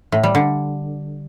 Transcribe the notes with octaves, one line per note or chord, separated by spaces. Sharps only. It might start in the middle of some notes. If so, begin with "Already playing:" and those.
A2
G3
D3